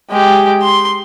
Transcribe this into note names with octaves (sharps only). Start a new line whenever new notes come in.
G#3 G4
C6